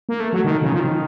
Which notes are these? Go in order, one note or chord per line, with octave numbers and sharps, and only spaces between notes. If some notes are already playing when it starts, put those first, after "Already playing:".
A#3
A3
F#3
D#3
C#3
F3
D#3